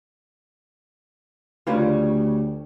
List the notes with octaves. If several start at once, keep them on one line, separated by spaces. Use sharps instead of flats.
D2 C#3 G3 F4 B4 C#5